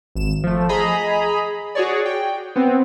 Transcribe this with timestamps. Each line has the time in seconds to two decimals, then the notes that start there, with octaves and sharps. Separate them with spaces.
0.15 G#1 E7
0.44 F3 A3
0.69 G#4 D#5 A#5 B5
1.75 F#4 G#4 C#5 D5
2.05 G5
2.56 B3 C4